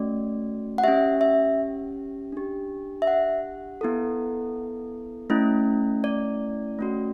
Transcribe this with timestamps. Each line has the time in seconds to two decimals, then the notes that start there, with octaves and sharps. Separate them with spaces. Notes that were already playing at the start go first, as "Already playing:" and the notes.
Already playing: A3 C#4 F#4 D5
0.78 F#5
0.84 C#4 G4 E5
1.21 E5
2.32 D4 G4
3.02 E5
3.07 F#5
3.81 B3 E4 A4
5.30 A3 C#4 E4
6.04 D5
6.79 A3 C#4 F#4